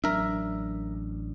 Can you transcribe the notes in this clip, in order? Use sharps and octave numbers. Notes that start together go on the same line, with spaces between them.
A1 F#3 D4 A#4 E5